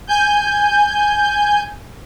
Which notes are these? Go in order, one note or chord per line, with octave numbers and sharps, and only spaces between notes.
G#5 G6